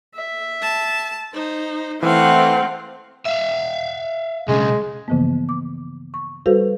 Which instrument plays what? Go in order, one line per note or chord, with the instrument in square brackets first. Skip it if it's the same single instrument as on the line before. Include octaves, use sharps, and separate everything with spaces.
[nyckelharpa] E5
[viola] A5
[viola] D#4 [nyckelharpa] C5
[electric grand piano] E3 [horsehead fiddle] A3 C4 [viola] F5 [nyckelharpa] F#5
[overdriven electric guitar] E5 F5
[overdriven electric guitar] B1 C#3 [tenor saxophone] G#3
[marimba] G2 C#3 E3 F3 A#3 B3
D6
C#6
G3 F#4 A4 B4 C5 F5